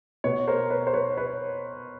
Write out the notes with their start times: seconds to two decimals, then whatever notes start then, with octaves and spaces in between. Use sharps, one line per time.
0.24 B2 B4 C#5
0.47 A#4 C5
0.70 B4 C#5
0.87 C5
0.94 B4 C#5
1.17 B4 C#5